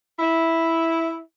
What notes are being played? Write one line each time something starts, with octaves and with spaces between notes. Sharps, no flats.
E4